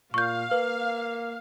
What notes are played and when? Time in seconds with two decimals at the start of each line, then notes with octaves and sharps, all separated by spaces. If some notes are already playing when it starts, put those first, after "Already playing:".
0.14 A#2 F5 C#6 G6
0.51 A#3 B4